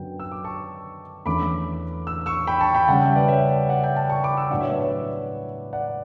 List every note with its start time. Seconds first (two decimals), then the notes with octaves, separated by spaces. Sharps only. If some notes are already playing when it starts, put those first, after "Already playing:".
Already playing: F#2 D3 F#3 B3 G5
0.20 E6
0.32 D6
0.44 A5 C#6
1.26 E2 D3 A3 C#4 B5 D6
2.07 E6
2.26 C#6 E6
2.47 G5 B5
2.61 A5 C#6
2.75 G5 B5
2.88 C#3 G3 C#4 F#5 A5
3.02 E5 G5
3.15 B4 D5
3.28 C#5 E5
3.69 D5 F#5
3.83 E5 G5
3.96 F#5 A5
4.09 A5 C#6
4.23 B5 D6
4.37 C#6 E6
4.50 A2 F#3 B3 D4 D5 F#5
4.61 C#5 E5
4.71 B4 D5
4.80 C#5 E5
5.73 D5 F#5